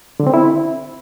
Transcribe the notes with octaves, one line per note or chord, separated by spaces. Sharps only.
D3
C4
E4